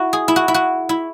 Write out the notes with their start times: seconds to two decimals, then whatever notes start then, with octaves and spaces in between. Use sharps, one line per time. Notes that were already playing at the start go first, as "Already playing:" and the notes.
Already playing: E4 F#4
0.13 G#4
0.28 E4
0.36 F#4
0.48 E4
0.54 F#4
0.89 E4